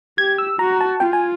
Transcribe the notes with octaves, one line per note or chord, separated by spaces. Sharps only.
G4 G#6
E6
F#4 A#5
A5
F4 G5
G#5